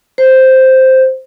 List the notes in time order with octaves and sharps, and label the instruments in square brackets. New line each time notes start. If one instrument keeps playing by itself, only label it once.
[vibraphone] C5